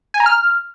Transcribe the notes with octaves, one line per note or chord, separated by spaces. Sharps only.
G#5
A#5
F6